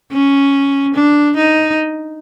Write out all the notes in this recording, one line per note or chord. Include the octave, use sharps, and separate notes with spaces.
C#4
D4
D#4